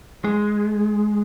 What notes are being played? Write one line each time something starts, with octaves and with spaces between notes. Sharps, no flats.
G#3